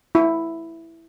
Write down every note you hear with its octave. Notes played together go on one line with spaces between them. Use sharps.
E4